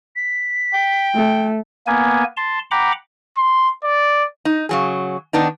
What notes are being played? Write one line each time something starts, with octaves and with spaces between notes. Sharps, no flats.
B6
G5
A3
A#3 B3 G#5
A5 C6
F#5 G5 A#5 B5 D6
C6
D5
D#4
C#3 F#3 G#4
D#3 B3 D4 D#4